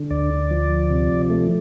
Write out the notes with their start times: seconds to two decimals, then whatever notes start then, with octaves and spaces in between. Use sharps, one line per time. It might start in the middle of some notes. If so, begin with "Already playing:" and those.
Already playing: D3
0.11 D2 D5
0.51 F3
0.90 C3
1.30 A3